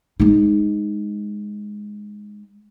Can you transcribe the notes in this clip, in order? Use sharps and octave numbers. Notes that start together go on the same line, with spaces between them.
G#3 D#4